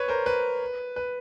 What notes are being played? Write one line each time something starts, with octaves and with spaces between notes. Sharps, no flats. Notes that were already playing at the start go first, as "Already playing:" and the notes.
Already playing: B4 C#5
A#4 C5
B4
B4